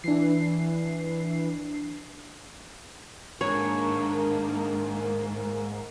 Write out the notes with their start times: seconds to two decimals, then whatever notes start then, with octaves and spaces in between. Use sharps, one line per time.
0.04 E3 D4 C7
3.41 G#2 D#3 A#3 D4 C#5